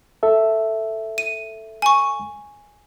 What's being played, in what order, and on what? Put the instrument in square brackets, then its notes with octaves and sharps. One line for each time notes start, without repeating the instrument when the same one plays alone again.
[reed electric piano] A4 E5
[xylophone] D#7
G#5 C#6